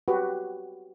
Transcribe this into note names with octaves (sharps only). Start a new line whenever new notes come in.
F#4 G4 B4